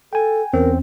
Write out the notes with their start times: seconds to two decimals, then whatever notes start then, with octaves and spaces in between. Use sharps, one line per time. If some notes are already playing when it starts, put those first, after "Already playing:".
0.13 A4 G5 G#5
0.53 E2 C4 C#4 A#4